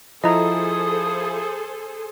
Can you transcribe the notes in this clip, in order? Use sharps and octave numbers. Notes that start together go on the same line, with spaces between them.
F3 E4 G#4 A4 C5 D#5 A#5 D#6